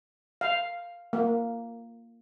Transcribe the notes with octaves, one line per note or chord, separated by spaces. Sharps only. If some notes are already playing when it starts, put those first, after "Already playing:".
F5
A#3